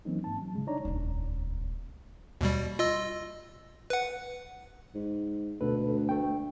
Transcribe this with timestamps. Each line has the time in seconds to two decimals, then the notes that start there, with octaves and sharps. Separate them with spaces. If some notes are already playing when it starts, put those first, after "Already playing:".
0.05 E3 F#3 A#3 C4 C#4 D#4
0.24 G#2 A5
0.42 F#3
0.55 C#3 G#3
0.67 D4 D#4 C#5 D5 A#5
0.85 D#1 C#2
2.41 D#2 B2 G3
2.79 F4 D#5 E6
3.90 B4 F#5
4.95 G#2
5.61 D2 B2 A4 B4
6.09 A3 G5